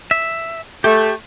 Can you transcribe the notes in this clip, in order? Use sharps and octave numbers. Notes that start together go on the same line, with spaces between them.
E5
A3 G4